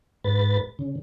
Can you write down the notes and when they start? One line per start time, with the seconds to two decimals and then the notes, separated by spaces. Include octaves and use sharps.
0.24 G#2 B4 A6
0.79 C#3